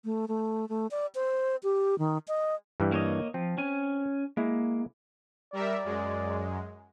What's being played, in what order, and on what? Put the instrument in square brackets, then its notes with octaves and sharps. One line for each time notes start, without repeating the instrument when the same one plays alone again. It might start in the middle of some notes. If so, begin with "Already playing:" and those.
[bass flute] A3
A3
A3
D5
C5
G4
D#3
D#5
[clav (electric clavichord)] G2 E3 G3
[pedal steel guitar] A#3 C#5 D#5
[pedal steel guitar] F3 [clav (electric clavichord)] C4
[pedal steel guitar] C#4 G#5
[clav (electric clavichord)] G#3 E4 [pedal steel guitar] A#3
[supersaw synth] G3 A#4 E5 [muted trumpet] D5
[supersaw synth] F#2 G#3